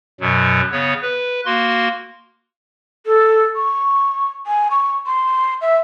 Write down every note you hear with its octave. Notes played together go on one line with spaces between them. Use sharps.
F#2 B2 F#3
C#3 B3 C#5
B4
A#3 F#4 C6
A4
C#6
G#5
C#6
C6
E5